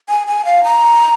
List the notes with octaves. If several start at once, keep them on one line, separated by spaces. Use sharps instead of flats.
G#5
G#5
F5
A#5